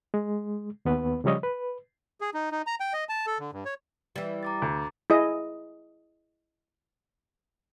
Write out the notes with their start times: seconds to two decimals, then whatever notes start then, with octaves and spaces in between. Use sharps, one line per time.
0.14 G#3
0.85 D#2 B3 B4
1.24 C#3 F3 G3 C#5 D#5
1.43 B4
2.21 G#4
2.34 D#4
2.52 D#4
2.67 A#5
2.80 G5
2.93 D#5
3.09 A5
3.27 A4
3.39 D3
3.52 G2
3.65 C#5
4.16 E3 G3
4.43 A#5 D6 A6
4.62 D2
5.10 E4 G#4 D#5